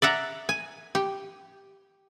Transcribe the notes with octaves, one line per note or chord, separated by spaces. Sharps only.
D5 E5 F#5 A#5
G#5
G4